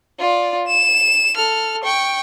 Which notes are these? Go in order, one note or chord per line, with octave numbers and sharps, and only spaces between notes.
F4 D5
E7
A4 F6
G5 C#6